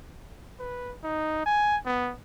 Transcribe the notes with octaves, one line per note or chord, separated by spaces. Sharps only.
B4
D#4
G#5
B3